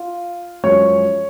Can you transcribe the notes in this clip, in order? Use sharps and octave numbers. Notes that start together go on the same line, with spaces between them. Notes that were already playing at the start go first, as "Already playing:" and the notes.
Already playing: F4
F#2 F3 G#3 C#5